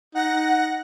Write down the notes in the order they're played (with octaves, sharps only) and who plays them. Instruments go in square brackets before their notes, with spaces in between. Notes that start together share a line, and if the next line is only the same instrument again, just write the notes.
[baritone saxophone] D#4 [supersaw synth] F#5 A#6